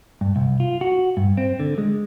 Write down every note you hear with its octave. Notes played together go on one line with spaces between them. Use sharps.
G2
C2
F4
F#4
G2
C4
D3
G#3